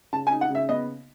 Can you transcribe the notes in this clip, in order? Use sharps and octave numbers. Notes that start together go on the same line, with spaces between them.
C#3 A5
G#5
D#4
F#5
C#3 E5
B3 D#5